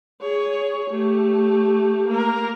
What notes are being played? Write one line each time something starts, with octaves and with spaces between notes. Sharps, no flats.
G#4 C#5
A3 G4
A#3 A#4